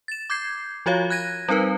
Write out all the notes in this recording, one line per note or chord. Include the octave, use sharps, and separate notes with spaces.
A6 E7
D6 G6 G#6 C7
F3 F4 F#4 C#5 F5
F#6 G#6 A#6 D#7
G3 C4 D#4 A#4 B4